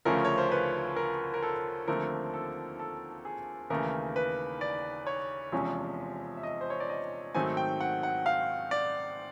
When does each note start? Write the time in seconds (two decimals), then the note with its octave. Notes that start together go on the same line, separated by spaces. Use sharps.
0.05 D2 C#3 F3 A3 C#4 A#4
0.25 C#5
0.38 C5
0.52 B4
0.96 A#4
1.34 A#4
1.42 A4
1.88 D#2 D3 F3 A3 C4 A#4
2.34 A4
2.79 A4
3.25 G#4
3.70 D#2 C#3 E3 A3 A#4
4.16 B4
4.61 D5
5.07 C#5
5.52 E2 C3 F3 G#3 C#4
6.37 E5
6.43 D#5
6.61 C5
6.70 C#5
6.80 D5
6.89 D#5
7.35 G#2 D#3 F#3 A3 C4 G#5
7.57 G5
7.80 F#5
8.03 F#5
8.26 F5
8.71 D5